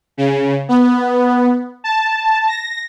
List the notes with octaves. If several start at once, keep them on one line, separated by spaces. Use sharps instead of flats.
C#3
B3
A5
A#6